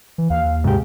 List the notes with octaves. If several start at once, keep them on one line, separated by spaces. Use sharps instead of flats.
E3
D#2 F5
G#2 C3 G4